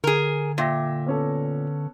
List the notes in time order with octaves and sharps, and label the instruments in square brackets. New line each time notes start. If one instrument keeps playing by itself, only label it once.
[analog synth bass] D3 [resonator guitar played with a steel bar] G#4 A#4
[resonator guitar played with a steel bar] A#2 [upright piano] E5 G5 A#6
[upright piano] B3 C#4 A4